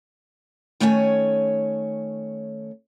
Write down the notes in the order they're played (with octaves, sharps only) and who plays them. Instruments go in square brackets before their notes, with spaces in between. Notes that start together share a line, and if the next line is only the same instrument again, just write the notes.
[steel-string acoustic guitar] D#3 A3 C#4 C#5 G5 G#5